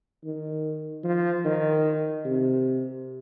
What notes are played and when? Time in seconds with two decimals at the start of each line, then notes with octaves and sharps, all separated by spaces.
0.24 D#3
1.04 F3
1.45 D#3
2.25 C3